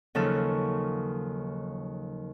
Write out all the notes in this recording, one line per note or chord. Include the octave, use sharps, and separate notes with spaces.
D#2 C#3 F3 F#3 A4